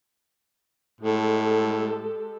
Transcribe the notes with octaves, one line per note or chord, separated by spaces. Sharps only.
A2 G#3 G4 A4